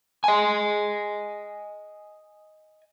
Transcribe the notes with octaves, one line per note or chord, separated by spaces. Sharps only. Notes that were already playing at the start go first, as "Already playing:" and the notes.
D#5 G#5